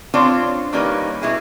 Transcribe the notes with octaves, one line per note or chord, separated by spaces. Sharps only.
C4 D4 F4 C5 C#5
D#3 G3 A#3 C#4 D#4 B4
B2 E4 G#4